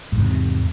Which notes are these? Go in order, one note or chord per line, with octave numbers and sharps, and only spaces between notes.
E2 G#2 C3